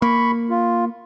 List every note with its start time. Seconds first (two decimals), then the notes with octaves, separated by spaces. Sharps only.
0.02 A#3 B5 C#6
0.50 F4